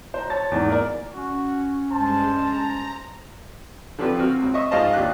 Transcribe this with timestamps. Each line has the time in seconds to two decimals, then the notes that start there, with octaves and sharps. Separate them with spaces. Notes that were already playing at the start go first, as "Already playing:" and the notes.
0.14 C5 A#5
0.30 C#5 A5 A6
0.51 E2 G#2
0.68 A#3 A#4 D5
1.15 C#4 F#4
1.92 G2 G#3 C5 A5
2.36 A#5
3.98 D3 F3 C4 G4 B4
4.19 C4 F#4 F6
4.39 C#2 C4
4.54 D#5 E5 C#6 D#6
4.71 G#2 F4 C5 D#5 F5 A5
4.93 D#2 D4 F4 G4 F#6